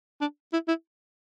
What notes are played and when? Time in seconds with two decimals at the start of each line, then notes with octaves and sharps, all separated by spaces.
0.21 D4
0.53 E4
0.68 E4